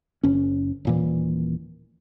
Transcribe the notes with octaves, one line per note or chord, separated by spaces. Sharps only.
F#1 C#4
D#1 A#2 E3